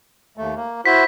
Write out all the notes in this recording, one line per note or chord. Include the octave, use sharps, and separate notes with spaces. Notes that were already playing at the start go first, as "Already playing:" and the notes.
D#2 A3
A#3
E4 F#4 C5 B6